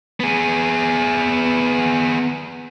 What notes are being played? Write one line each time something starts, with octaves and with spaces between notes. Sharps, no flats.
B3 G#4